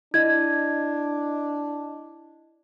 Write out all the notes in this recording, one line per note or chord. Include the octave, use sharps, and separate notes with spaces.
D4 E4 D#5 G#6